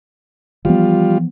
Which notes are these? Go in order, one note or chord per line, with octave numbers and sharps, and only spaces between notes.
E3 F3 G3 B3 F4